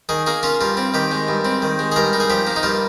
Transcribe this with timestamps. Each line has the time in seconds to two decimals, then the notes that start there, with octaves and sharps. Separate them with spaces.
0.09 D#3 G#4
0.26 A#3 G#4
0.43 C#4 F4
0.61 G2 F4
0.77 C4
0.94 D#3 G4
1.11 G#3
1.28 G2
1.45 C4
1.62 D#3
1.79 G#3
1.92 G#4
1.96 G2 A#4
2.13 D#4
2.20 G#4
2.30 F3 G4
2.47 A#3
2.56 D#4
2.63 G2 F4